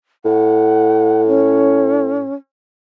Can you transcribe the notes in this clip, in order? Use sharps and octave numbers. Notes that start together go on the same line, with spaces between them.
A2 F#5
C#4